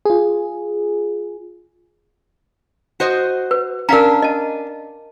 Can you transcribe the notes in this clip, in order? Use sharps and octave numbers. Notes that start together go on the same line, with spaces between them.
F4 G#4
F#4 C5 D#5
B4
C#4 D4 A#4 F5 A#5
D#5 A5